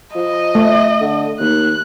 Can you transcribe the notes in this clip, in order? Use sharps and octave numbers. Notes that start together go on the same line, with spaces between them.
F3 D#5
A3
D3
D#2 F#6